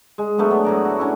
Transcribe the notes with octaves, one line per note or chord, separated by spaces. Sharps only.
G#3
F#3 A3 B3 D4
B3
A2 F#3 D5
F#4
C#4 D4 E4